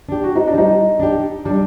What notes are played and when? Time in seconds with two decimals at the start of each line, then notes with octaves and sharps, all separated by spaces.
0.09 D4 G4
0.23 F#4
0.36 D#4
0.47 D4
0.54 G3 D#4
1.00 D4 G4
1.45 G3 D4